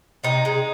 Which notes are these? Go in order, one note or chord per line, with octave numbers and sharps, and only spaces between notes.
C3 D#4
G#3